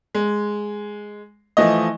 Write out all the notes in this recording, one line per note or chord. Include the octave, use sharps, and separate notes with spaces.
G#3
E3 F3 A3 D#5